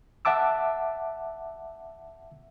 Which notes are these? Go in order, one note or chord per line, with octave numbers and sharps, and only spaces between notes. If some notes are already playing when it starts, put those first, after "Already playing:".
E5 F#5 A5 D6 E6